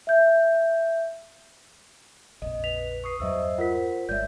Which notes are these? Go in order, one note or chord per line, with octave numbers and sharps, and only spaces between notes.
E5 G6
A#1 F2 D#5
B4 B6 F7
C#6 D#6 C7
E2 G2 F#3 C5 D#5 E5 E6
F4 A#4 F#5 B6
G1 G#3 C#5 D5 E5 G6